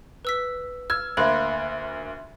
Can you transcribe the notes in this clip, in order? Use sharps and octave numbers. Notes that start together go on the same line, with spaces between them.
B4 E6 B6
E6 F6 G#6
D2 A#3 E5 B5 C6 F#6